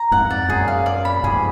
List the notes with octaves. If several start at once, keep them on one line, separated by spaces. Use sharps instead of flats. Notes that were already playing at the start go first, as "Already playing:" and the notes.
Already playing: A#5
F2 G#2 F#5
D5
F#2 A#2 G#4
F5
D5
B5
F2 G#2 G#4